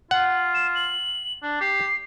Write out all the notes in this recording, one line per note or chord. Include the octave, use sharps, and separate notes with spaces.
F4 F#5
E7
F#7
D4
G4 C7